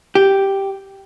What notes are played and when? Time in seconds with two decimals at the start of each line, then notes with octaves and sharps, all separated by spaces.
0.15 G4